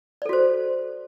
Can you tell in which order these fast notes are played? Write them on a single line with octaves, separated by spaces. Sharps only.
D5 A4 F#4 C5